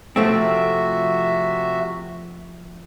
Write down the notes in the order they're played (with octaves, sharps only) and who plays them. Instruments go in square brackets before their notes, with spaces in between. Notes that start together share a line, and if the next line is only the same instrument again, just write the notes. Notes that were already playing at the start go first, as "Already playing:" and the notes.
[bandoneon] C3 F#4 E5 [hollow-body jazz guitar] F3 A3 C4